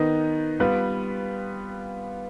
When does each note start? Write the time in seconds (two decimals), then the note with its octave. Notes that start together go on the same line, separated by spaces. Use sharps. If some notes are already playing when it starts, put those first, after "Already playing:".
Already playing: D#3 B3 D#4
0.60 G3 B3 F4 B4